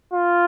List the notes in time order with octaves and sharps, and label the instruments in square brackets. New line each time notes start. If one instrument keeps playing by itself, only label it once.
[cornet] F4